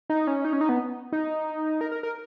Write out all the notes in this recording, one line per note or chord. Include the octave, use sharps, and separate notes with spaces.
D#4
C#4
D#4
C#4
D#4
B3
D#4
A#4
A#4
A#4